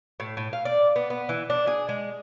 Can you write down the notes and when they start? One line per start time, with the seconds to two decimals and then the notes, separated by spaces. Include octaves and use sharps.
0.20 A2
0.37 A2
0.53 F5
0.65 D5
0.96 B3
1.10 B3
1.29 E3
1.50 D4
1.67 G#4
1.89 G#3